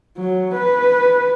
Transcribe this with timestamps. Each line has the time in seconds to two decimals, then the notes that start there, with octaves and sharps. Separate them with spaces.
0.17 F#3
0.54 B4